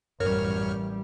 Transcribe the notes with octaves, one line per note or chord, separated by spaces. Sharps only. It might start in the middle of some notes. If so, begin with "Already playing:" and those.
A1 F#2 G3 A#4 C#5 F6